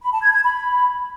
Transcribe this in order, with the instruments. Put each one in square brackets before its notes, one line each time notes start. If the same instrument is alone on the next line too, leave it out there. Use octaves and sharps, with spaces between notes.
[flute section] B5
A5
G#6
G#6
B5